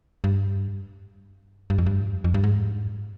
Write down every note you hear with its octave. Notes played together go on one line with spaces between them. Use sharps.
G2
G2
F2
G2
F2
G2
G#2